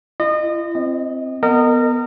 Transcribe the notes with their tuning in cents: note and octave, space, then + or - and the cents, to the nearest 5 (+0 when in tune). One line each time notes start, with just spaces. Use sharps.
E4 +45 D#5 -30
C4 +0 D#5 +20
B3 +5 A#4 -30 D#5 -20